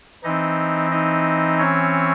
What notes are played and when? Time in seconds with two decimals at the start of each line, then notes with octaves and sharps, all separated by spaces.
0.23 E3 C4 D#4 D#5
0.91 D#4 D#5
1.58 C#4 C#5